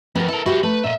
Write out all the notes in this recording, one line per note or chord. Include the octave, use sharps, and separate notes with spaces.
F2 B3 A#4
E4 A4 A#4
E4 F#4 G4 C5 F#5
A3 B4
A#2 D#5 E5